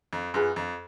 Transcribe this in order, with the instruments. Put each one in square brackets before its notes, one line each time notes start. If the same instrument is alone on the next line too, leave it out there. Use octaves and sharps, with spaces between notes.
[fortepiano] F2
[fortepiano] F#2 [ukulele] F4 G#4 B4
[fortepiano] F2